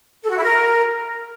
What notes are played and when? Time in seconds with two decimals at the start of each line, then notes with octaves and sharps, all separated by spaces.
0.23 A4
0.30 F#4
0.36 E4
0.42 A#4